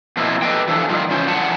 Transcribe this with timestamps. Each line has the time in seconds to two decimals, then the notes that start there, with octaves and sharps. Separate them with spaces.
0.17 B2 F3 A#3 C4 E4 F4
0.42 G4 A4 B4 D5 D#5 G5
0.68 E3 F3 D4 A4
0.89 D#3 G3 F4
1.10 C#3 E3 C#4 C5
1.27 E2 F3 G3 F#5 A5